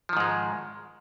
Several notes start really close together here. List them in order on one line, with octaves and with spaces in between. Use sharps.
F3 D#3 G#2 G#3